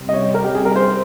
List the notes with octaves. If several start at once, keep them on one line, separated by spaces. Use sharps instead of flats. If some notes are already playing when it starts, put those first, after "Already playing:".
Already playing: C3 G3 C4
D#5
C#5
A#4
G4
G#4
A#4
C5